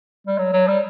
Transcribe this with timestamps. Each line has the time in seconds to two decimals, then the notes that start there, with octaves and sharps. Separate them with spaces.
0.27 G3
0.38 F#3
0.53 F#3
0.68 G3